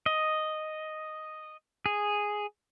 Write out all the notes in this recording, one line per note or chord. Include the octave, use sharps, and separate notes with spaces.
D#5
G#4